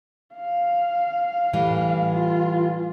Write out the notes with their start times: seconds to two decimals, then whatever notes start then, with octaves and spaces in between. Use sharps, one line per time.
0.35 F5
1.53 A2 E3 G3
2.12 F4